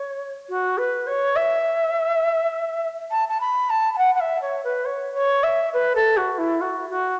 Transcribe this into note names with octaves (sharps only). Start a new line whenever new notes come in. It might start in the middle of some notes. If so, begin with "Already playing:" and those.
Already playing: C#5
F#4
B4
C#5
E5
A5
A5
B5
A5
A5
F#5
F#5
E5
C#5
B4
C#5
C#5
E5
B4
A4
F#4
E4
F#4
F#4